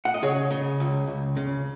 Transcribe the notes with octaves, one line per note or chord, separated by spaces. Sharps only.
F#5
D#5
C#3 G#4 C#5
C#3
C#2
C#2
C#3